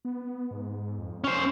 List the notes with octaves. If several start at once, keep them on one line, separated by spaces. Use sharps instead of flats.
B3
G#2
F2
C#4 C5